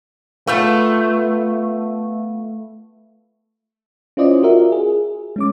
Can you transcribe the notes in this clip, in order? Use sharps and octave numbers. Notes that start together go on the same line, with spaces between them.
A3 B3 F4 B4
C#4 E4 F4 C5 D5 D#5
F4 F#4 A#4 E5
G#4
G#3 C#4 D6